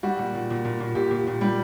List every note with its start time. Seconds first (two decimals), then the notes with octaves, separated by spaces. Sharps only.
0.03 G3 F#4
0.19 A#2
0.34 A#2
0.50 A#2
0.65 A#2
0.80 A#2
0.95 A#2 G4
1.10 A#2
1.27 A#2
1.41 G3